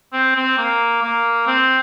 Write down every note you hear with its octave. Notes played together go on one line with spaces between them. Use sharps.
C4
C4
A#3
A#3
C4